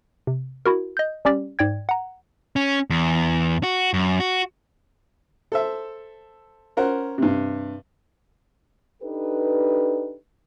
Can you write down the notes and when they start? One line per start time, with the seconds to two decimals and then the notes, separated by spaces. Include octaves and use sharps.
0.27 C3
0.66 E4 F#4 A#4
0.97 D#5 G6
1.25 G3 C#4 G4 D5
1.59 G#2 D5 G5 G#6
1.89 F#5 A#5
2.56 C#4
2.90 E2
3.63 F#4
3.94 F#2
4.20 F#4
5.52 A4 C5 E5
6.77 C#4 A#4 C5 F#5
7.18 G2 C3
9.03 D4 D#4 G4 A4 B4